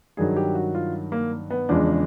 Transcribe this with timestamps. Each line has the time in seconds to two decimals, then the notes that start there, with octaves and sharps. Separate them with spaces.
0.17 G2 D#3 F#3 G#4
0.36 G4
0.55 F#4
0.75 F4
1.12 A#3
1.50 B3
1.69 E2 C#3 F3 G#3 D4